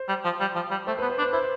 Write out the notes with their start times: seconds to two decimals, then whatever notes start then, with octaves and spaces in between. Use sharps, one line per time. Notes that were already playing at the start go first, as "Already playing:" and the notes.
Already playing: C5
0.08 G3
0.25 F3
0.41 G3
0.55 F3
0.71 G3
0.87 A3 C5
0.98 B3 B4
1.10 C5
1.19 D4
1.22 B4
1.33 E4 C5